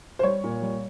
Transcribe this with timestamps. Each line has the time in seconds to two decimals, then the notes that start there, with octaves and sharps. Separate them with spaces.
0.19 C5
0.23 G3 C#5
0.44 A#2
0.62 G3